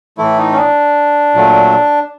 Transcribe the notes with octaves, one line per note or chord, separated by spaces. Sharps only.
A2 E3 A3 E4
D#4
C#4
D4
A#2 F#3 A3